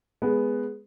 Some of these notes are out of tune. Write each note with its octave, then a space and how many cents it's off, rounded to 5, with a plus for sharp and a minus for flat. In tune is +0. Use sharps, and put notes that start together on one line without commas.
G#3 +0 B3 +0